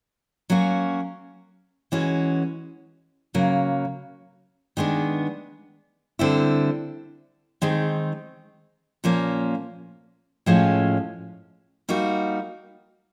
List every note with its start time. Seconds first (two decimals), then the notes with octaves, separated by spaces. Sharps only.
0.50 F#3 A#3 C#4 F#4
1.92 E3 G#3 C#4 F#4
3.34 C#3 F#3 A#3
4.77 D#3 G#3 B3 D4
6.19 D3 G3 C4 E4
7.62 D#3 G#3 C4 D#4
9.04 A#2 F3 A#3 C#4
10.46 A2 F3 G#3 C#4
11.89 G3 A#3 D#4 F#4